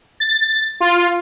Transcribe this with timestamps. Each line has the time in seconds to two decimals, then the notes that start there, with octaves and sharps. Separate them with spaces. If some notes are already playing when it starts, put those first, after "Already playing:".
0.20 A6
0.80 F4